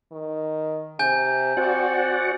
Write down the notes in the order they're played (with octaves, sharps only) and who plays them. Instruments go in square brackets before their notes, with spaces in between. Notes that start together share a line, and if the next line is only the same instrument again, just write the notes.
[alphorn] D#3
[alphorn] C3 [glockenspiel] G#5 G6
[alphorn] C4 [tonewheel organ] F#4 D5 F#5